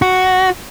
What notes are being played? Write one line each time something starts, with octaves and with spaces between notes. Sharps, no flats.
F#4